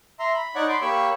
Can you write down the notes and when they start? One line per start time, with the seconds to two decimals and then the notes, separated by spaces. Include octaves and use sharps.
0.19 E5 A#5 C6
0.34 B5
0.55 D#4 C#5 D5 F#5 C#6
0.69 B5 C6 D6
0.82 A#3 G4 C#5 B5 C#6 E6